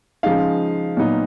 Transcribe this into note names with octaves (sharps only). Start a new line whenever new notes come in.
C#3 F3 G#3 D#4 F5
A#2 F#3 B3 D#4